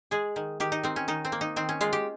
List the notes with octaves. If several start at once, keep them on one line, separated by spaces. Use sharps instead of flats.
G#3 G#4
D#3
D#3 G4
D#4
D#3 C4
C#4
D#3 D#4
C4
A#3
D#4
D#3 C4
C#4
G#3 F4
G4